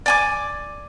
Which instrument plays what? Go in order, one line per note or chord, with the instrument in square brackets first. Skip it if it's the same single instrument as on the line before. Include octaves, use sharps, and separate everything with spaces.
[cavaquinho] D5 G#5 D6